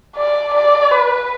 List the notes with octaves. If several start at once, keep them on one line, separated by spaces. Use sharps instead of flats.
D5
D5
B4